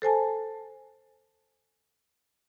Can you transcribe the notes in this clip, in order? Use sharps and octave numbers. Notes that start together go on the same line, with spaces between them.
A4 C5 G#5 A5